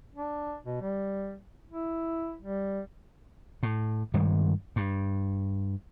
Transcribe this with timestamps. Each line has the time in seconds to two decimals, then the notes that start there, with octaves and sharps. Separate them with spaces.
0.15 D4
0.65 B2
0.81 G3
1.70 E4
2.42 G3
3.63 A2
4.14 G2 D#3 G3 G#3
4.76 G2